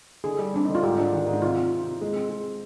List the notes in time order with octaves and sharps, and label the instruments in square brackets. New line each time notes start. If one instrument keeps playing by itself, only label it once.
[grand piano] D3 [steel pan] G#4
[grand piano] G3
[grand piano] C4 [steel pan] D4
[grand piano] D3 [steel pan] D#4
[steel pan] F4
[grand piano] G#2 [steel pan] G4
[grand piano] D4
D#3
G#2
[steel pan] D#4
[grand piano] C3 [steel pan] F4
[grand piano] C4
C3
C3
G#3
C4
G#3